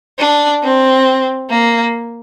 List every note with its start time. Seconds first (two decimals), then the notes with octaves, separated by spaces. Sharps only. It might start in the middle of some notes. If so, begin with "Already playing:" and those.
0.19 D4
0.63 C4
1.50 A#3